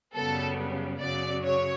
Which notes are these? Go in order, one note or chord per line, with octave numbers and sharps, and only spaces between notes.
F#2 C#3 G3 B3 A4
F#2 C#3 F#3 D5
C#5